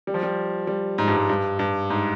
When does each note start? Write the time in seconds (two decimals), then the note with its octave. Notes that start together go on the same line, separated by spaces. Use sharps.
0.07 G3
0.14 F3
0.23 G3
0.67 G3
0.98 G#2
1.08 G2
1.16 G#2
1.29 G2
1.59 G2
1.90 G#2